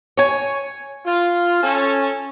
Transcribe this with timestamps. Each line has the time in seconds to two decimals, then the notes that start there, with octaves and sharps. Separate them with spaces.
0.17 C#5 G#5
1.06 F4
1.63 C#4 A4